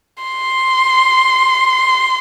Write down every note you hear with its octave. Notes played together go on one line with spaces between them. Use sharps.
C6